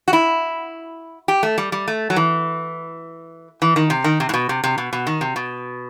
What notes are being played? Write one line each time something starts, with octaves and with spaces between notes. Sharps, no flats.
F#4
E4
G4
A3
G3
G3
A3
F#3
E3
E3
D#3
C3
D#3
C3
A2
B2
C3
C3
B2
B2
D#3
C3
B2